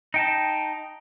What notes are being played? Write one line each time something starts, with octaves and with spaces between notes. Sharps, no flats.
D#4 G5 A5